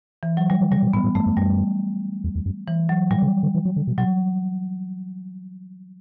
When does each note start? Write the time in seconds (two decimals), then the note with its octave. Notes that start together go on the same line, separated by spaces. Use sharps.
0.23 E3
0.37 F#3
0.50 E3 G3
0.61 E3
0.71 C#3 G3
0.83 B2
0.93 A2 B3
1.04 A2
1.15 G2 A3
1.26 F#2
1.37 F#2 G3
2.24 E2
2.35 E2
2.46 F#2
2.68 E3
2.89 F#3
3.10 A2 G3
3.22 C#3
3.43 D3
3.55 E3
3.65 F#3
3.76 D3
3.87 B2
3.98 B2 F#3